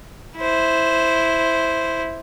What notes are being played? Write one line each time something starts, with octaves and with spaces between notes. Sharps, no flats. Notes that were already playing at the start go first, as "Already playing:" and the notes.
E4 C5